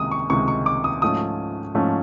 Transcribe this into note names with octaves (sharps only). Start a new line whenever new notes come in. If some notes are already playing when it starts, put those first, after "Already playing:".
Already playing: C#2 C3 D#3 G#3 D#6
C#6
C#2 C3 D#3 G#3 C#6
C#6
D6
D#6
G#2 F3 A3 C#4 D#6
G#2 F3 A3 C#4